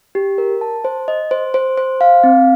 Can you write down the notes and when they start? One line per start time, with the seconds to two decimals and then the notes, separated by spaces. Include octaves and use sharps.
0.15 G4
0.38 A#4
0.61 A5
0.84 C5
1.08 D#5
1.31 C5
1.54 C5
1.78 C5
2.01 F5
2.24 C4